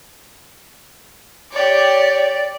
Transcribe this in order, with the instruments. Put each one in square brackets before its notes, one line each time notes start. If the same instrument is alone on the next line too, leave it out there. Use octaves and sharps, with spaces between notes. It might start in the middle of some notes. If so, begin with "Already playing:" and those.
[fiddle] G4 C#5 [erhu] D5